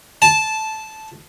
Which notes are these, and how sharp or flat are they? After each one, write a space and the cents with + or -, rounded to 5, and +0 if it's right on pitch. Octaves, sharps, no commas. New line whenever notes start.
A5 -10